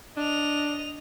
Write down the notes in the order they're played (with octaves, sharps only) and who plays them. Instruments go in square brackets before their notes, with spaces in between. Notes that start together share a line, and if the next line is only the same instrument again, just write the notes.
[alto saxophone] D4 [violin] D#5 F7